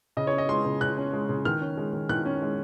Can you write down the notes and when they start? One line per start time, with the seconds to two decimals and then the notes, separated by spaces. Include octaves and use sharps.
0.17 C#3 D#5
0.27 C#5
0.33 C#4
0.38 D#5
0.49 G#3 C6
0.65 C#3
0.81 C#3 F#6
0.97 C#4
1.13 G#3
1.29 C#3
1.45 D#3 F6
1.61 C#4
1.77 G#3
1.93 D#3
2.09 D#3 F#6
2.26 C#4
2.42 G#3